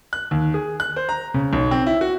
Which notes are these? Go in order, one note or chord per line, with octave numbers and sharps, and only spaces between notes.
F#6
D#2
G#4
F#6
C5
A#5
C#3
B1
C4
E4
F#4